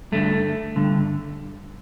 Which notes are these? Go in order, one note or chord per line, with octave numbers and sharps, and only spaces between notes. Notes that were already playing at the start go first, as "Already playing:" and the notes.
G2 D3 A3
G2 D3